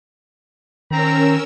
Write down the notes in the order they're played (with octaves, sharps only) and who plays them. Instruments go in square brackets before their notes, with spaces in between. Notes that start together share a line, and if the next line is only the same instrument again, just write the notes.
[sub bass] D#3 [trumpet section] C4 A#5 [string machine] C#4 A#4 E6